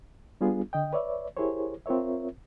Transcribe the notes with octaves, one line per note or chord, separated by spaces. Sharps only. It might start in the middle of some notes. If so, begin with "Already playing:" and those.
G3 B3 D4 F4 G#4
D3 D#5 G5
B4 C#5 D5 E5
E4 G4 G#4 A#4 C5 C#5
C4 F4 A#4 C#5 E5